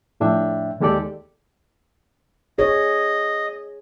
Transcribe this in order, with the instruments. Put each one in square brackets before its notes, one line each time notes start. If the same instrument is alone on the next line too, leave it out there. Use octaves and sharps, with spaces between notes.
[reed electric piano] F2 A2 D4 E5 G5
D#2 G#3 G4 A4 D5
[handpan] G#4 C#5 [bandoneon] D#5